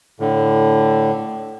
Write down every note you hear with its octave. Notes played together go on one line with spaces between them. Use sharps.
A2 D3